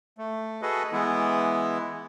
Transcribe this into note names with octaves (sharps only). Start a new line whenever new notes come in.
A3
F#4 G#4 A4 B4 D#5
E3 G#3 B3 E4